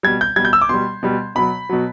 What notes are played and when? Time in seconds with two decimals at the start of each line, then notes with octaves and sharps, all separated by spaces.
0.03 B2 G3 G#6
0.21 G6
0.36 B2 G3 G#6
0.45 G6
0.53 E6
0.61 D6
0.69 B2 G3 C6
1.03 B2 G3
1.35 B2 F#3 B5
1.69 B2 F#3